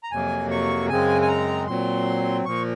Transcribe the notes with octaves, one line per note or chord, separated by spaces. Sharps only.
A#5
F2 C3 F#3 A#3 G#5
C#6
F#2 C#3 G#3 C4 G#5
G#5
A#5
A#2 F#3 C4 C6
A#2 F3 A#3 C#6